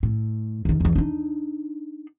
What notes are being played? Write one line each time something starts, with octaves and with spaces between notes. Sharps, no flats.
A2
E2 D#3
E2 E3
D4 D#4